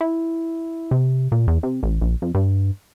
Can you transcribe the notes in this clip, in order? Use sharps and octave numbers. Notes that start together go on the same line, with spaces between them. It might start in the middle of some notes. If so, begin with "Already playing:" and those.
E4
C3
A#2
E2
C3
A1
A#1
F2
G2